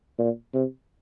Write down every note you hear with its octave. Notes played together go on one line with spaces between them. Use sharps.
A#2
C3